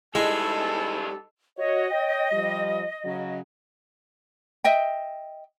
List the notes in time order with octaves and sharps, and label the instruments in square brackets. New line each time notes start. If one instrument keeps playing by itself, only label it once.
[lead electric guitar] G3 D#4 [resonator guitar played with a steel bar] G#3 [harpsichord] E4 G#4 [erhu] A4
[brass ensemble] F#4 C#5 [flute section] D#5
[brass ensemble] C#5 G5
F3 G3
C#3 F#3
[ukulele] D#5 E5 G5